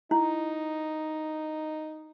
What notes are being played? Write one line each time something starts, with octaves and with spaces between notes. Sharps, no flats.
D#4 E4